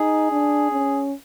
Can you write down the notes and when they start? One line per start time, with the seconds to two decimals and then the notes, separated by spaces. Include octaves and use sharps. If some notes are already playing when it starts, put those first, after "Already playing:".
Already playing: D#4 G#4
0.32 D4
0.72 C#4